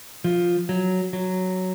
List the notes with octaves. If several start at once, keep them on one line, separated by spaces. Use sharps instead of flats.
F3
F#3
F#3